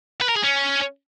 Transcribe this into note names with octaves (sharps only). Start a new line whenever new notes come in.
B4
A#4
G#4
C#4